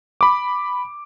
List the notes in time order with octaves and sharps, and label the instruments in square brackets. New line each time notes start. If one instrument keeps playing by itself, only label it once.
[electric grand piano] B5 D6